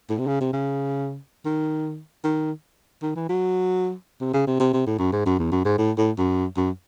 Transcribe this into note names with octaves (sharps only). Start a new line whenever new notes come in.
A2
C3
C#3
C3
C#3
D#3
D#3
D#3
E3
F#3
C3
C#3
C3
C3
C3
A2
F#2
G#2
F#2
E2
F#2
G#2
A2
A2
F#2
F#2